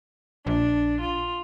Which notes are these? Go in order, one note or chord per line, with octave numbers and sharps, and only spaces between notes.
A#1 D4
F4